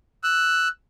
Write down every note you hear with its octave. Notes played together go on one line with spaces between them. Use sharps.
E6 F#6